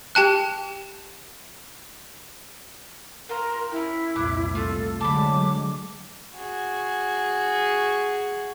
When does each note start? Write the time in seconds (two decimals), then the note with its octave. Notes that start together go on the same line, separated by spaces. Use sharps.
0.15 G4 G5 A5 F#6
3.29 F4 A#4 C5
3.72 C#4 E4 G4
4.16 C2 F2 A#2 C5 D6 F#6
4.55 A3 F4 A4
5.01 D3 F#3 G#3 A5 B5 D6
6.36 F#4 G#4